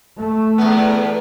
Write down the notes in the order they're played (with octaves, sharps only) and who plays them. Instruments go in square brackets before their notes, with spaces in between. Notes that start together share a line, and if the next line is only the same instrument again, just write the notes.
[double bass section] A3
[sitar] E2 B3